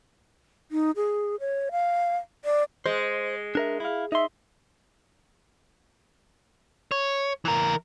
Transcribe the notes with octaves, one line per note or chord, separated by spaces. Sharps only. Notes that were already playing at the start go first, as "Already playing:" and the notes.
D#4
G#4
C#5
F5
D5
G#3 C5
D4 A#4 E5
E4 F5
D#4 E5 C6
C#5
E3 A#4